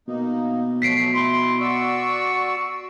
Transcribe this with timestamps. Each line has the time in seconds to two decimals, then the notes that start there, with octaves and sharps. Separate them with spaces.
0.08 B2 A#3 D#4
0.82 F3 F#3 A3 B6 C7 D7
1.14 E4 C6
1.60 F#4 D5 C#6 E6